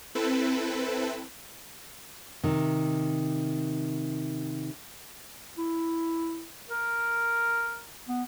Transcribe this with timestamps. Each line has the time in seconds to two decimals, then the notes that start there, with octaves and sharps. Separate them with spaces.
0.15 C4 E4 A4 B4
2.44 C3 D#3
5.58 E4
6.70 A#4
8.08 B3